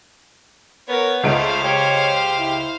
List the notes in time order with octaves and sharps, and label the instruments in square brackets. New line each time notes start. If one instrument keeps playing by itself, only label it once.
[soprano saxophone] B3 [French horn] A#4 [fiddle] C#5
[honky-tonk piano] C#2 D#4 D7 [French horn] A3 [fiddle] C5 F5
[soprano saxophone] G4 [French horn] C#5
[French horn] E4